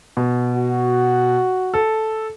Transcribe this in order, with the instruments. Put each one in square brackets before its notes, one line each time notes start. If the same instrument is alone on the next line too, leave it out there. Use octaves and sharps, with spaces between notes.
[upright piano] B2
[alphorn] F#4
[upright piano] A4